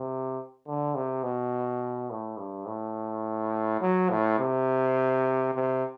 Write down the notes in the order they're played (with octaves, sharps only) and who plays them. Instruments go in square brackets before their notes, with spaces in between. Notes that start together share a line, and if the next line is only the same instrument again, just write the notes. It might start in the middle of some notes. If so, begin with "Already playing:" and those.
Already playing: [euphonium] C3
D3
C3
B2
A2
G2
A2
F#3
A2
C3
C3